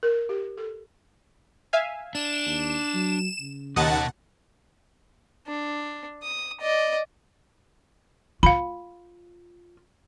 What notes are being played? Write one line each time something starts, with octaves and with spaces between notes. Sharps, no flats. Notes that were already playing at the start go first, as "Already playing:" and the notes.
A#4
G4
A4
E5 F5 G#5
D4 E7
D#2
F#3
C#3
D#2 B2 D#5 F#5 A5 A6
D4
D#6
D5 D#5
F4 F5 B5